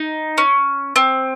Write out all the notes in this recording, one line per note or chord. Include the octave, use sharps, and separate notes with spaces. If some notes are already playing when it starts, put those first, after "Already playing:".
Already playing: D#4
C#4
C4